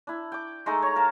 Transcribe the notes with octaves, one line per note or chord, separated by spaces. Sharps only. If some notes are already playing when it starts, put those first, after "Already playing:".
D4 E4
G5 D6
G#3 A3 D#4 A4
C#5 A#5
A#4 F5 A5